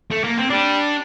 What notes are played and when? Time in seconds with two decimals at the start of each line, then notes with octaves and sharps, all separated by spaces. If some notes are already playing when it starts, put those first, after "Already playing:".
0.11 A3
0.24 A#3
0.37 C4
0.50 G3 D4